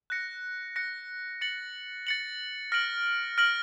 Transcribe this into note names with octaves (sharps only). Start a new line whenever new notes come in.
F#6 A#6 C#7
F#6 A#6 C#7
A6 C#7 F#7
A6 C#7 F#7
F6 A#6 D7 F#7
F6 A#6 D7 F#7